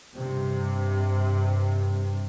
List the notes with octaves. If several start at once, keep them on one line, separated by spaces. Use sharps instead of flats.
G2 C3